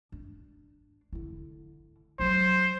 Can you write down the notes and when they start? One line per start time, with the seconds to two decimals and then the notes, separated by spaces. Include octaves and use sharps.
0.12 D4
1.13 D3 E4
2.19 F#3 D#4 C5